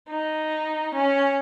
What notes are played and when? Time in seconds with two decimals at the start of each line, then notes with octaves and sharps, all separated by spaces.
0.10 D#4
0.94 C#4